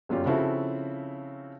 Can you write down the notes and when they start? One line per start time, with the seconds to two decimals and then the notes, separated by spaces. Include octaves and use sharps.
0.09 G1 F#2 C#4 F4 G4
0.26 C#3 F3 C4 E4 F#4 A4